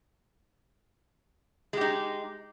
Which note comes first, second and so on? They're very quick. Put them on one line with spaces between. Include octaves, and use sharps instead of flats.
G#3 G4 D#4